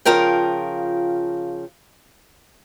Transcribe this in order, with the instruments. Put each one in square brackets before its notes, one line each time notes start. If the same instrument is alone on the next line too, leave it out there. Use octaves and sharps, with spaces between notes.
[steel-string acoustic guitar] C#3 F3 F4 A#4 G5